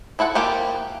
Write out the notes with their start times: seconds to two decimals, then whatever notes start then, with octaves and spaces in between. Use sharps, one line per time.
0.19 F3 E4 A4 F#5
0.35 F3 A#3 G4